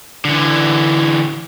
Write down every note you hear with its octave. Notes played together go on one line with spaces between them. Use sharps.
D3 E3